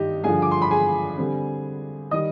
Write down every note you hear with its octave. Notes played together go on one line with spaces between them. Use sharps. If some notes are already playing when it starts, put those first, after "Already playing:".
Already playing: G2 D#3 D#4 G4 D#5
G2 D3 F3 G#4 G#5
D6
C6
B5
G#4 G#5
D3 G3 C4
D#3 G3 D#5 D#6